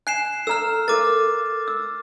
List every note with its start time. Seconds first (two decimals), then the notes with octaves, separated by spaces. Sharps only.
0.07 G#5 F#6 C7 E7
0.47 A4 A#5 E6 F6
0.88 A4 A#4 D6 A6
1.68 E6